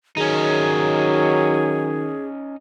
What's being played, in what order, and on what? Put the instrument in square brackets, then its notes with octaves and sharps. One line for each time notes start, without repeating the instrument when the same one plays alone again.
[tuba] D#3 [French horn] F#3 [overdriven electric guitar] C#4 D#4 [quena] G#4